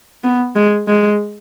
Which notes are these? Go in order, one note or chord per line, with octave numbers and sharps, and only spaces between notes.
B3
G#3
G#3